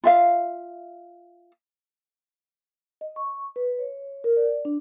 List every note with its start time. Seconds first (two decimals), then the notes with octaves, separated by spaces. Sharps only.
0.04 F4 E5 F5
3.01 D#5
3.16 C#6
3.56 B4
3.79 C#5
4.24 A#4
4.37 D5
4.65 D4